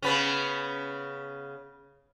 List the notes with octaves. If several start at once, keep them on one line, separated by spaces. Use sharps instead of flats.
C#3 B3 C#4